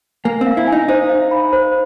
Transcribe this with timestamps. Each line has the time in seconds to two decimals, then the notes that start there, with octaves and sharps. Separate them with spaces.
0.25 A#3 G#5
0.41 C4
0.47 F5
0.57 E4
0.67 D#4 G#5
0.88 D#4 C5
1.10 F5
1.31 B5
1.53 C5